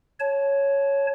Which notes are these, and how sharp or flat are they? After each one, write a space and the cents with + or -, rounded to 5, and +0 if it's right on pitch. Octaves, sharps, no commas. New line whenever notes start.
C#5 +0 A5 -25